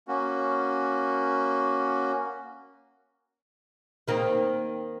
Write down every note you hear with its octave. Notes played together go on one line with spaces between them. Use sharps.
A#3 C#4 F#4
D#3 A#3 C4